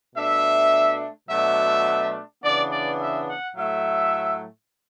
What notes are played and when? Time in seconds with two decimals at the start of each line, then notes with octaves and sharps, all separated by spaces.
0.16 B2 A3 D4 E5
1.29 B2 F#3 A3 D4 E5
2.43 C#3 E3 B3 D4 D5
2.71 D5
3.00 E5
3.28 F#5
3.56 A2 F#3 A3 E5